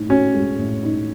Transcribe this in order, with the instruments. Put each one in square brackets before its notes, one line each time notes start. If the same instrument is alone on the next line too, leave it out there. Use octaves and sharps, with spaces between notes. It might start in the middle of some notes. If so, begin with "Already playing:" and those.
Already playing: [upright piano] A2 D#4
[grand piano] C#4 [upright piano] F#4
[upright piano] G#3
A2
D#4